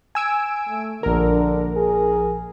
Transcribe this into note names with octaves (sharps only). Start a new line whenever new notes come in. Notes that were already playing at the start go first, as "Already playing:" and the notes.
G#5 E6 D7
A3
A#1 D3 A#4
G#4